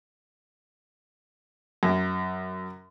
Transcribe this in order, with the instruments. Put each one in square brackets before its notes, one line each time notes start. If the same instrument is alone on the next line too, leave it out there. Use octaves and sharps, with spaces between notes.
[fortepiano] F#2